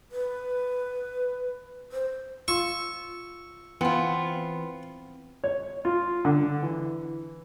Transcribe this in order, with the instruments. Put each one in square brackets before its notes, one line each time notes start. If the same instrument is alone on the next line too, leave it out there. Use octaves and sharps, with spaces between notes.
[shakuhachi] B4
C5
[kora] F4 [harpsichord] C#6 [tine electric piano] E6
[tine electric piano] E3 C#7 [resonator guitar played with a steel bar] B3 F4 [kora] C4
[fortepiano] C#5
F4
D3
E3